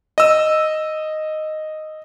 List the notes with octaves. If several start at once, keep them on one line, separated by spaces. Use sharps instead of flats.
D#5 E6